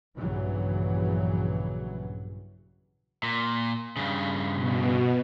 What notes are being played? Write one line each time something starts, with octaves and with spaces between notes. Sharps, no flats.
A#1 G2 C#3 E3 F#3
A#2
G2 C#3
B2